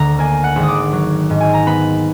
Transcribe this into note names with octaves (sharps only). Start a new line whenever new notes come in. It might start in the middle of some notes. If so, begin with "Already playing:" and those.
Already playing: D2 D3 A#5
A#3 G#5
F#5
G#1
D#6
D6
F#3
G#2
G#5
A#5
B3 B5